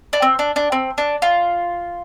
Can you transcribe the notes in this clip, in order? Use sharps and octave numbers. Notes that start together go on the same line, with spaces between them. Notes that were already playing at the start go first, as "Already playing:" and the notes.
D4
C4
D4
D4
C4
D4
F4